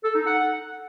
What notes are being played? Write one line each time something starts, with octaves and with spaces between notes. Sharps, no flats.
A4
D#4
F#5